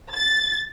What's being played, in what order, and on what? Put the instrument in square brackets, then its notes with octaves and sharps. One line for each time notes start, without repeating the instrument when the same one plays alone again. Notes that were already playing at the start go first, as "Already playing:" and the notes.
[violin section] A6